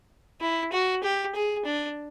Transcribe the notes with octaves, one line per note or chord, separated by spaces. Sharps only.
E4
F#4
G4
G#4
D4